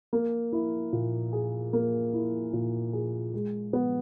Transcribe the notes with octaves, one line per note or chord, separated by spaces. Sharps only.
A#3
E4
A#2
G#4
A#3
E4
A#2
G#4
G#3
B3